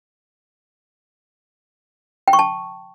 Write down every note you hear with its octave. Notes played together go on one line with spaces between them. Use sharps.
G5
C#6
A5